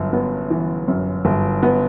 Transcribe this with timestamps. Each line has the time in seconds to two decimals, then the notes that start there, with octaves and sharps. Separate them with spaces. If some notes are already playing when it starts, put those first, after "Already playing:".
Already playing: G1 F#2
0.13 B3
0.50 E3
0.88 F#2
1.25 G1
1.63 B3